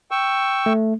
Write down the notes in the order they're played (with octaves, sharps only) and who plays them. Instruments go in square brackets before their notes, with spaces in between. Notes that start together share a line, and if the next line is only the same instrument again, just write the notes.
[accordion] G5 C#6 E6
[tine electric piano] A3